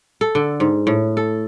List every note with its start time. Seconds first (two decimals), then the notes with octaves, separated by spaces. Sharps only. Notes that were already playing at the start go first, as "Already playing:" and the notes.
0.21 A4
0.35 D3
0.60 G#2
0.87 A2
1.17 A4